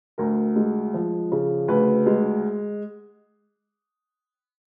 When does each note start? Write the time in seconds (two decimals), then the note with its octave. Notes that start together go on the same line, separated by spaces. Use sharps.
0.18 D2 A#4
0.56 G#3
0.94 F3
1.32 C#3
1.68 D2 B4
2.06 G#3